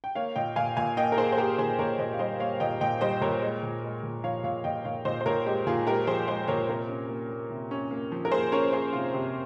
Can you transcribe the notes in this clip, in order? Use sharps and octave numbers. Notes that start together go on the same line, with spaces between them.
G5
A#3 C#5 F5
A#2 D#5 G5
A#2 F5 G#5
A#2 F5 G#5
A#3 D#5 G5
A#4
A#3 G#4 C5
C5
A#3 G4 A#4
A#2 G#4 C5
A#2 A#4 C#5
A#2 C5 D#5
F5
G3 C5 D#5
A#3 C#5 F5
A#2 D#5 G5
A#2 D#5 G5
G3 C5 D#5
A#2 A#4 C#5
G#3
A#2
G#3
A#2
F3 C#5 F5
A#2 C#5 F5
A#2 D#5 G5
A#2 C#5 F5
A#2 C5 D#5
C5
A#2 A#4 C#5
G#3 G4
A#2 F4 G#4
G#3 G4 A#4
F3 G#4 C5
G#3 G#4 C5
A#2 A#4 C#5
C3 A#4 C#5
C#4
A#3
A#3
C3
C#4
A#3
F3
A#4
A#3 G#4 C5
C#4 A#4 C#5
C#4 G#4 C5
C3 F4
C3 G4